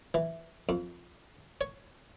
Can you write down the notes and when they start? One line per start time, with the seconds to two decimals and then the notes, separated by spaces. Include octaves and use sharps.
0.14 E3
0.69 F2
1.61 C#5